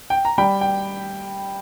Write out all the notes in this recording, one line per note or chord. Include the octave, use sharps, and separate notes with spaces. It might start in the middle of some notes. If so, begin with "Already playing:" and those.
G5
A#5
G3 G5 B5
G5